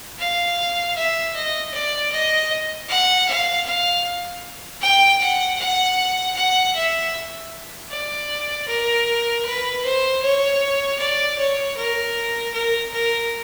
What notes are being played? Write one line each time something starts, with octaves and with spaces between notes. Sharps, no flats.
F5
E5
D#5
D5
D#5
F#5
F5
F5
G5
F#5
F#5
F#5
E5
D5
A#4
B4
C5
C#5
D5
C#5
A#4
A#4
A#4